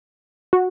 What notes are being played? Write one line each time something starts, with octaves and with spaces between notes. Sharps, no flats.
F#4